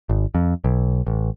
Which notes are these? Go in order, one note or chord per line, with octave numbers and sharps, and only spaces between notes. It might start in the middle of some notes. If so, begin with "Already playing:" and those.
G#1
F2
B1
A1